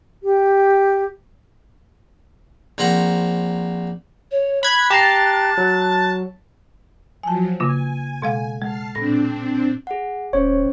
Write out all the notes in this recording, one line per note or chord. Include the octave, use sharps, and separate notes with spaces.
G4
A#1 C4 A#4 F#5
C#5
B5 F#6 G#6
G4 A5 A#5 C7
F#3
F3 F#3 G#5 A5
C#3 A#3 F4 G#5
B2 G#3 F5
G#3 A5 F6 C7
A#2 C4 D4 A#6
G#4 F#5
D#1 C#4 C5 C#5